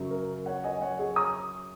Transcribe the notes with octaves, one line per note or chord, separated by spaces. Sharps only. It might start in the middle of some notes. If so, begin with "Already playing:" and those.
Already playing: F#2 C#3 F#3
A#4
C#5 F#5
D#5 G#5
C#5 F#5
G#4 C#5
A#5 D#6